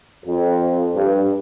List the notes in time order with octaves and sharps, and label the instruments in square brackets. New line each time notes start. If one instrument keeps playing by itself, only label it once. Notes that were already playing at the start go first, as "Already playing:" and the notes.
[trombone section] F2
G2